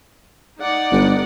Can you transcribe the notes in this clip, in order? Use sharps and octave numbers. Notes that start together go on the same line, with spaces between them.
D#4 D5 F#5
G1